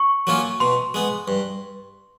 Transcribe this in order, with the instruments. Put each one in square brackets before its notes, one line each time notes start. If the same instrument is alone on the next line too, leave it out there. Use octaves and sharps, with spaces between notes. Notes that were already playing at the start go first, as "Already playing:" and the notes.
Already playing: [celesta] C#6
[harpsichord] F#3 A#3 C#4 F4
[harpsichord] B2 [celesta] C6
[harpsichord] G#3 B3
G2